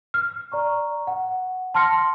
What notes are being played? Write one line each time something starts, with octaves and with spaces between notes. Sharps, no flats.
F6
D5 A#5 C#6
F#5
A5 C6 F6 A#6 C#7